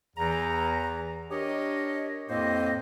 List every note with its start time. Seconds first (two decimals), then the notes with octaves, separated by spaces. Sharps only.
0.16 E2 E3 A#5
1.30 D4 G4 A#4 C#5 D#5
2.29 F2 A2 A#3 C4 C5 D#5